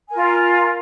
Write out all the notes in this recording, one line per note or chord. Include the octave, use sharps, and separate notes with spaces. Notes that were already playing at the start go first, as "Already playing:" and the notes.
F4 A#4 G#5